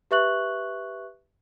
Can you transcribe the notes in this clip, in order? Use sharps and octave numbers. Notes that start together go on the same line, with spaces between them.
G4 B4 E5 C#6 F#6 F#7